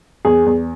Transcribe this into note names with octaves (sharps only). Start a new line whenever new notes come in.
E2 G#4
E2